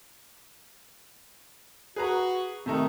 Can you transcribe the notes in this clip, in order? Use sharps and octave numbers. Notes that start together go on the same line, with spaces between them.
F#4 G#4 B4 A#5
C3 D#3 A3 A#5